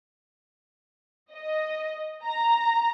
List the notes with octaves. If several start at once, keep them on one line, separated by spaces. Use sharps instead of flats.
D#5
A#5